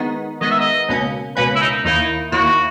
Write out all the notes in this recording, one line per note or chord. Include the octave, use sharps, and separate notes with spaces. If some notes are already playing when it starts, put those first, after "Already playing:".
Already playing: D#3 G#3 B3 D#4
D#3 G#3 B3 D#4 D#5
E5
D#5
C#2 B2 A#3 C#4
C#2 B2 A#3 C#4 B4
E4
D#4
D#2 D#3 A#3 D#4 E4
D#2 D#3 A#3 E4 F#4